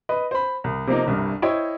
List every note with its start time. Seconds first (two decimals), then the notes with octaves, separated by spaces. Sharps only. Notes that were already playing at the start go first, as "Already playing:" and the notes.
0.09 B4 D#5
0.31 C5 B5
0.64 C2
0.87 C3 F3 A#3 D#4
1.06 G1 C2 G2
1.42 E4 C5 C#5 D#5 G5